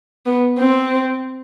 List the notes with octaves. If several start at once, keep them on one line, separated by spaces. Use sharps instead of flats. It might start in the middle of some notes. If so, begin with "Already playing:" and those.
B3
C4